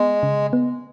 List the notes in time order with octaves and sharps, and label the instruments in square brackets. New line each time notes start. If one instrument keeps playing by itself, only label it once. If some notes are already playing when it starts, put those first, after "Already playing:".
Already playing: [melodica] G#3 [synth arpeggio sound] B3
[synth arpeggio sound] C#3
B3